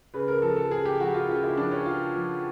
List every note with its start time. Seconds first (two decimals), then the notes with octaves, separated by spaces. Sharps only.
0.14 C#3 B4
0.28 A#4
0.42 F3 A4
0.56 A4
0.71 C#3 G#4
0.86 G4
1.00 F3 F#4
1.14 F4
1.29 C#3 F4
1.44 E4
1.57 F3 D4
1.72 C#4
1.86 C#3 F4
2.15 F3